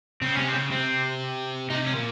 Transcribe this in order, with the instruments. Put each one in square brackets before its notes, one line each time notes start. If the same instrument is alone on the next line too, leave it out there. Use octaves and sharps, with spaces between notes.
[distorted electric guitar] C#3 [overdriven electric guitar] C4
[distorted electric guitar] C3 [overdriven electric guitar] C#4
[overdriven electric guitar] C4
[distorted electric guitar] C#3
[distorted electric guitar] C3 [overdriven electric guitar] C4
[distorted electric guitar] C3 [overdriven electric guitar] D#4
[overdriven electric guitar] C#4
[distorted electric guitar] A#2